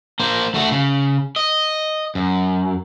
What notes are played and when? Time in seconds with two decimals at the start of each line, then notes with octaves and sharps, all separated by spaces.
0.20 A#3 C5
0.54 A3 F#4
0.72 C#3
1.36 D#5
2.15 F#2